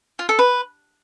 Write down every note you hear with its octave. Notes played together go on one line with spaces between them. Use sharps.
F4
A4
B4